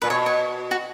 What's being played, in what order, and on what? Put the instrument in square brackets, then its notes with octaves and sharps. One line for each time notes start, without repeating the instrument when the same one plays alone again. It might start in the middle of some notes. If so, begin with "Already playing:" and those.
[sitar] A#2 [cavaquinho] B4
[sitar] B2 [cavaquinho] C#5
[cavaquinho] C#5
F#4